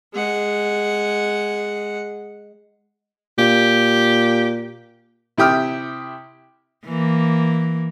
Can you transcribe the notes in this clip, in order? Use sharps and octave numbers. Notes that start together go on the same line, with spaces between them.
G#3 F#5
A#2 G4
C3 E4 G4 G5 D#6 F6
E3 A#3